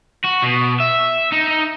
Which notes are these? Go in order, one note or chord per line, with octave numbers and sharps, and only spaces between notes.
F#4
B2
E5
D#4